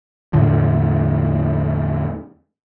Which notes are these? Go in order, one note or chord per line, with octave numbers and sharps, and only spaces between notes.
E2 A2 D3 F3